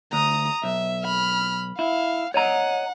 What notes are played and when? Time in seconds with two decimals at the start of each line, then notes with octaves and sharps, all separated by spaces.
0.13 D2 A#5 D#6
0.64 B1 E5
1.05 B5 F6
1.79 E4 F5
2.34 C#5 D#5 F#5 A#5